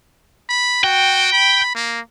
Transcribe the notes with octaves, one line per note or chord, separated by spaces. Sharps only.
B5
F#4 G5
B5
A#3